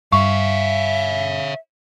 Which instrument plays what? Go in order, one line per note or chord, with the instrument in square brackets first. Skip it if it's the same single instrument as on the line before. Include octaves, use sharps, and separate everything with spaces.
[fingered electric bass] G2 [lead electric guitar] C#5 F5 [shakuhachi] E5 [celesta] C#6